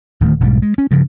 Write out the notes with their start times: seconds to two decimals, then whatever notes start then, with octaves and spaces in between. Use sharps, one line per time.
0.21 D1 D#3 A3
0.40 E1 B1 G#2 G3
0.62 G#3
0.78 C#4
0.91 G2 C#3 F3